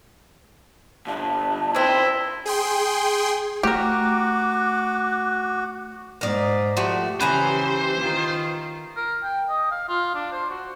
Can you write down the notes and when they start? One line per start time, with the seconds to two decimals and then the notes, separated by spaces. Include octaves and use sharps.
1.07 G2 D3 A5
1.75 B1 D#3 C4 E4 C5
2.45 G#4 G5 C6
3.63 A3 F#4 G4 A#4 D6 F#6
6.21 G#2 A#4 D5
6.77 F3 A3 F#4 G4
7.21 C#3 E3 B4 C5 G#5 A#5
8.00 D#3 F4
8.96 A#4
9.23 G5
9.49 D#5
9.71 F5
9.89 F4
10.15 D4
10.32 C5
10.50 F#4